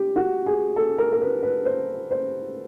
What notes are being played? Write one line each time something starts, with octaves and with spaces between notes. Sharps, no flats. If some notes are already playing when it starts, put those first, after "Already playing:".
Already playing: G4
F#4
G#4
A4
A#4
A#4
B4
B4
C5
C5